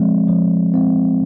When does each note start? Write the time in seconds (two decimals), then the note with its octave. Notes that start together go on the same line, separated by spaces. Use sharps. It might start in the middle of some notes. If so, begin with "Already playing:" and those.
Already playing: F3 G#3 C4
0.28 F3
0.74 G#3 C4